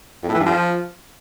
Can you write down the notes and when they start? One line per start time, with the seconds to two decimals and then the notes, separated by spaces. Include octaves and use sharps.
0.23 F2
0.28 A2
0.34 E3
0.40 G2
0.46 F3